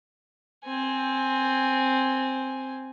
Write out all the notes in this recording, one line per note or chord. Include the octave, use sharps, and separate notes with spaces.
C4 G#5